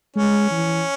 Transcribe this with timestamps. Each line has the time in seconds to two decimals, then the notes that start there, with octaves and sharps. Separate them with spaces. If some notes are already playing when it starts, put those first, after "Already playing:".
0.16 G#3 C#4
0.51 E3